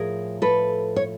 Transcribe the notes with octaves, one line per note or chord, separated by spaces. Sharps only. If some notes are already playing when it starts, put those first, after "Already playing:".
Already playing: A2 F3 G#4 A#4
A4 B4
C#5